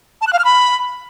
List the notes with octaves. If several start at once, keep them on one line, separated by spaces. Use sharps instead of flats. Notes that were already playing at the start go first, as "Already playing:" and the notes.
A5
F#6
F5
F6
B5